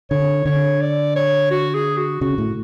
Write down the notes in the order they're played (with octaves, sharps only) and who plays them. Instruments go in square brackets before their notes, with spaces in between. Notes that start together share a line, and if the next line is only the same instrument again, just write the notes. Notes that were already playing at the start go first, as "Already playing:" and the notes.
[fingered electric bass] D3 [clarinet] C#5
[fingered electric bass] D3 [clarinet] C#5
[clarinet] D5
C#5
F#4
G#4
F#4
[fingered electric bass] C#3 [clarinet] F#4
[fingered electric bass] A2